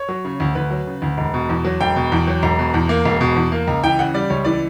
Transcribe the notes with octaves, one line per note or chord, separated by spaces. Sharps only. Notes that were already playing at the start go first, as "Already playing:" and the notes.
Already playing: C#5
F#3
C#3
D2
D2 B4
F#3
C#3
D2
E1
B2
E2
F#3
E1 G5
B2
E2
F#3
E1 A#5
B2
E2
A#3
E1
B2
E2
A#3
C#2 A#5
E3 G5
C#3 F#5
G3 D5
C#2 C#5
E3 D5